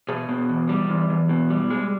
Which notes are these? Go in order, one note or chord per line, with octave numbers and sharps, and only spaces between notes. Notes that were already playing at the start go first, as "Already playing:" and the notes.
B2 G#4
B2
E2
G3
E2
E2
B2
G3
G#3